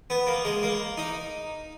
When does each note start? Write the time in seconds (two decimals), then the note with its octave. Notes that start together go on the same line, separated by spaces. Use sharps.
0.10 B3
0.27 A#3
0.45 G#3
0.63 A#3
0.98 D#4